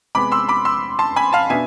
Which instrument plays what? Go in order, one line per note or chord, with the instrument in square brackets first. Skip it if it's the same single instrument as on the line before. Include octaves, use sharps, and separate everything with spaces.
[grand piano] C3 G#3 B3 B5 D6
C6 E6
B5 D6
C6 E6
A5 C6
G#5 B5
F5 A5
B2 B3 D4 E5 G#5